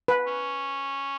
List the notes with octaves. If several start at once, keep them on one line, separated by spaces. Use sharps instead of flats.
B4
C#4